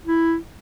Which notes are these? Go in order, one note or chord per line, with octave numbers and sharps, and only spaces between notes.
E4